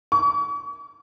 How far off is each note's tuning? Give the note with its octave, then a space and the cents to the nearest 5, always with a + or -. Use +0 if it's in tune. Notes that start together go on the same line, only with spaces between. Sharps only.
C#6 +45